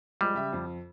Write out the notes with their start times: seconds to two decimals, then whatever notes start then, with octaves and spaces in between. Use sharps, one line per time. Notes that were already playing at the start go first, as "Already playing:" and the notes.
0.21 F3 G3 G#3
0.34 C#3 G4 E5
0.53 F2